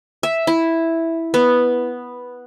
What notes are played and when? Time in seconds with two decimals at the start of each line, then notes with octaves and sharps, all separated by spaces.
0.23 E5
0.47 E4
1.34 B3